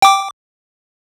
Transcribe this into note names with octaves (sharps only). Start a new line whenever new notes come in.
G5 D6